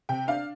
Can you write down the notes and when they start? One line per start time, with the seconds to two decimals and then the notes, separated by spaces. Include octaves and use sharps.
0.09 C3 G5
0.28 D4 F5